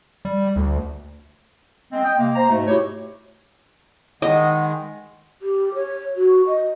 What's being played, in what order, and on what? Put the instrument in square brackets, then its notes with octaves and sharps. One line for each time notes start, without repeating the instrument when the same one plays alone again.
[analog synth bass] G3
D2
[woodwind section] G#3 C4
D#5 G5
C3 G#3 A#3
C5 A#5
G#2 B2 A3
E4 F#4 G4 C#5
[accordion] D#3 G#3 [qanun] D#5 [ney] F#5
[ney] G4
C#5
F#4
D#5